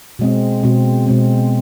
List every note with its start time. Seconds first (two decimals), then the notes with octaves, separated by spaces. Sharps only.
0.19 B2 G#3 C4
0.63 B2 G#3 C4
1.06 B2 G#3 C4